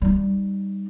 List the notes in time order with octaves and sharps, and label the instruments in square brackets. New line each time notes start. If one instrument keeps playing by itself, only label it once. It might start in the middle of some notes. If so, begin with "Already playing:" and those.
[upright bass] G3 D#4